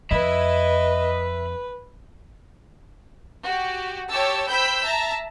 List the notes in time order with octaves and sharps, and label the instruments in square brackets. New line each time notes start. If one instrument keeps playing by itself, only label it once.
[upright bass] F2 [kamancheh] B4 [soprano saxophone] D#5 [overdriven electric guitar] E5 B5
[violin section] F#4 G4
G4 C#5 A5 E6
C5 G5 B5 E6 G6 B6
E5 A5 A#5